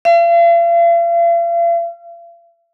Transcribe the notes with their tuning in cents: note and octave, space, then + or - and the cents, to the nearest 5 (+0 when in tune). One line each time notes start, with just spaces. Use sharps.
F5 -45